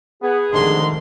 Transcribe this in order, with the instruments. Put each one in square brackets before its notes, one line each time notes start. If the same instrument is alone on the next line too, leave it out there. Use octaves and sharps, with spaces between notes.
[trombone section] B3 [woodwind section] G#4
[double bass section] F1 D#3 A3 [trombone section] D2 G#2 [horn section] C3 D4 C6